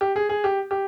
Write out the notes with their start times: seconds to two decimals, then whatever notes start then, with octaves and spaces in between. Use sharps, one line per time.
0.01 G4
0.16 G#4
0.29 G#4
0.44 G4
0.71 G4